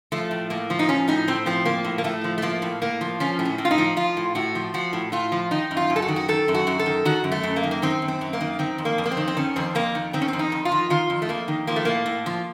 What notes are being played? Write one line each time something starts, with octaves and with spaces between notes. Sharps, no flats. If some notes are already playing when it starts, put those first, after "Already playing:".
F3 A3
A2
A2 A#3
F3
D#4
F3 C#4
A2 D#4
A2 C4
F3 C4
F3 A#3
A2
A#3
A2 A3
F3
A3
F3 A#3
A2
A2 A#3
F3
F3 C#4
A2
C#4
A2
F4
D#4
F3
F3 F4
A2
A2 F#4
F3
F3 F#4
A2
A2 F4
F3
D#3 D#4
F#2
F4
F#2
A4
F#4
D#3
F#4
D#3 A4
F#2
F#4
F#2
A4
D#3
D#3 F#4
F#2
A3
F#2
A#3
D#3
A#3
D#3 C4
F#2
C4
F#2
A#3
D#3
D#3 C4
F2
A#3
F2
A#3
C4
D#3
C4
D#3 C#4
F2 C4
F2 A#3
D#3
D#3 C4
C#4
C4
F2
D#4
F2
F4
D#3
D#3 F4
F2
A3
F2 A#3
D#3
F3 A#3
A3
A2 A#3
A2
F3